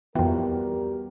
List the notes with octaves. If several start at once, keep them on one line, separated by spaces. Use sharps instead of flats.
F2 E3 G3 B3 F#4 G4 A#4 G5